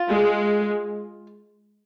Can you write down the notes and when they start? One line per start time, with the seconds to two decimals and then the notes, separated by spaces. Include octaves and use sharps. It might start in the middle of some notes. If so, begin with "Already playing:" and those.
Already playing: F4
0.10 G#3